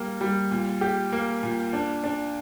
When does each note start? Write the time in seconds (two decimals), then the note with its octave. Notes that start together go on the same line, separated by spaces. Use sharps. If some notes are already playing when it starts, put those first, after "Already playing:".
Already playing: G3 A#3
0.21 G3
0.51 A#2
0.81 G4
1.12 A#3
1.43 A#2
1.73 D4
2.04 D4